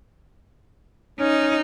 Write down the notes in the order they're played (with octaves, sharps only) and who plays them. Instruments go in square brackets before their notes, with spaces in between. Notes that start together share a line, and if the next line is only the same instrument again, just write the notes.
[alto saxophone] C#4 [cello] D#4